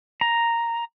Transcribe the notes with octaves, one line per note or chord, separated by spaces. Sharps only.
A#5